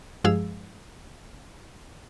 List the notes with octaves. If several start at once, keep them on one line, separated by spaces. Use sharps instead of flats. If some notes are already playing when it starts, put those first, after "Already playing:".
G2 F3 G#3 G#4 F5 E6